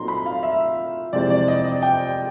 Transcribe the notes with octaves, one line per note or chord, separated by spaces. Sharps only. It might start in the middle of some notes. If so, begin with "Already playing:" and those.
Already playing: A#2 F#3 A3 C4 D#4 A#5 C6
B5
F5
E5
F2 C3 E3 G#3 C4 D5
D5
D#5
D#5
G5